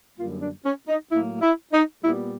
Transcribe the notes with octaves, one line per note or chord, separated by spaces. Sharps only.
F#2 D3 G3 A#3 F4
D4
C#4
D#4
A2 F#3 A#3 E4
E4
D#4
A#2 G3 B3 E4